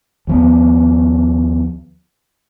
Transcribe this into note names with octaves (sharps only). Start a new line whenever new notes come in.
D#2 F3 B3